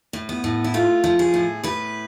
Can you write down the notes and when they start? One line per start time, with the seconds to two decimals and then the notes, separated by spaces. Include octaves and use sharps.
0.13 A2
0.29 B3
0.44 A2
0.64 E4
0.74 A3 F4
1.04 F3
1.19 G#4
1.34 A2
1.64 A2 B4